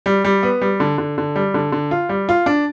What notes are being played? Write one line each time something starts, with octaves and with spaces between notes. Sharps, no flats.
G3
G3
B3
G3
D3
D3
D3
G3
D3
D3
F4
G3
F4
D4